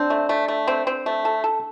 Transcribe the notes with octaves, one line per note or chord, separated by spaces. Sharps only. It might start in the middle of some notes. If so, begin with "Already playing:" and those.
Already playing: C4 D4
A3
A3
A3
C4
C4
A3
A4
A4